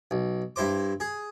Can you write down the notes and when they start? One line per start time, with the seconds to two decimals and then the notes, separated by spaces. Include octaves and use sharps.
0.11 B1
0.56 G2 E4 C5 D6
1.00 G#4